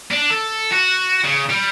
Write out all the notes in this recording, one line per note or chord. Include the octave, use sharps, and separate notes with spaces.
D4
A4
F#4
C#3
G3